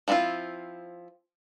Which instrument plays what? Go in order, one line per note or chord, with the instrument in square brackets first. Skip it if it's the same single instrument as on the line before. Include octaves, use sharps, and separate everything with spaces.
[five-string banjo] F3 B3 C4 E4 F4